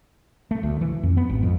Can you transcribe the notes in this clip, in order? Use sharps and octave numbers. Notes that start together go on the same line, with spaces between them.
A3
D2
E3
F2
B3
G#1
F2